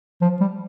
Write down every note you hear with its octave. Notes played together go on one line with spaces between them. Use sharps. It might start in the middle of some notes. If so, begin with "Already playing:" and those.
F3
G3